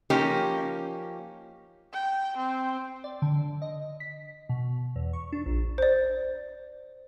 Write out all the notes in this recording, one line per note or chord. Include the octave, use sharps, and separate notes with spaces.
F3 A#3 C#4 D#4 G4
G5
C4
D5
D3
D#5
B6
B2
E2
C#6
D4
A#1
C5 D5